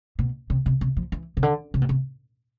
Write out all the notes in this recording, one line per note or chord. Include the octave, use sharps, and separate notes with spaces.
B2
C3
C3
C3
F3
E3
C3
D3
C3
B2
C3